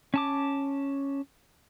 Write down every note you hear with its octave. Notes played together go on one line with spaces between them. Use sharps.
C#4 A5 D6